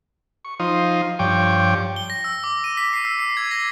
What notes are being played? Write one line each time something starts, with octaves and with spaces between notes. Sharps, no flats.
C#6
F3 D#4 F4 C5 D#6
G2 F3 C#5 G5 D6
G7
A#6
E6
D6
D#7
B6
C7
E6
C7
G#6
A#6